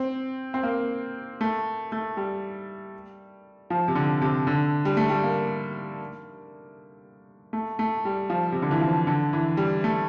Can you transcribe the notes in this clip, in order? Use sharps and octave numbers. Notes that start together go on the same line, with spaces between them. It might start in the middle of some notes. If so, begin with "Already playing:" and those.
Already playing: C4
C4
A#3
A3
A3
G3
F3
C3
D3
C3
D3
G3
A3
G3
A#3
A3
A3
G3
F3
C3
D3
E3
F3
D3
E3
G3
A3